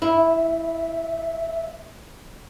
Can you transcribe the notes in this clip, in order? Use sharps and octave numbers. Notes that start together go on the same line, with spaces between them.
E4 E5